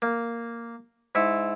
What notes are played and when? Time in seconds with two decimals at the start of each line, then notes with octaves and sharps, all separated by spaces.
0.02 A#3
1.15 G#2 E4 E5 C#6